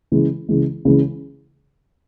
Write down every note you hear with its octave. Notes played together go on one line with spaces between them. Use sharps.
C#3 E3 G#3
C#3 E3 G#3
C#3 E3 G#3